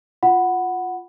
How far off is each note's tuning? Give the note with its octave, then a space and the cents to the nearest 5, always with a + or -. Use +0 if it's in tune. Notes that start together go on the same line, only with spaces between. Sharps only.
F4 +0 F#5 +0 B5 +0